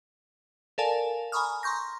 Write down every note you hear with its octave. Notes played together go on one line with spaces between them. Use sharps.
A4 A#4 D5 F5 G#5 A5
G#5 A#5 B5 C#6 D#6 F6
A#5 C6 C#6 G6 A#6